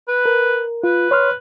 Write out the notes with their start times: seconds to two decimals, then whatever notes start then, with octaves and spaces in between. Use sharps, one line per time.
0.08 B4
0.26 A#4
0.84 F4 B4
1.11 C#5 C6 F6